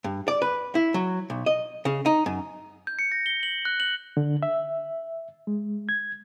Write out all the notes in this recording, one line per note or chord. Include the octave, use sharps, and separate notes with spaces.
G2
D5
B4
E4
F#3
B1
D#5
C#3
D#4
F#2
G6
C#7
A#6
G7
F#7
F#6
F#7
D3
E5
G#3
G#6